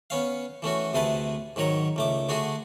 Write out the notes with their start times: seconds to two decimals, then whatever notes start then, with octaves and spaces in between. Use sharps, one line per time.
0.10 B3 C#4 F5
0.62 E3 A3 C#4 F#4
0.93 D2 C3 A3 G#4 B4 A5
1.56 G#2 D#3 F#3 C#5 A#5
1.96 C#2 A3 D6
2.29 D3 A3 D4 F#4 G#4